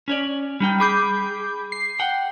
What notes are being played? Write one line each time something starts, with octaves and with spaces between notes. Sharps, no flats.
C#4 C#5 D5
G3 D#4 G5
G#4 B5 D6 G6
C7
F#5 G5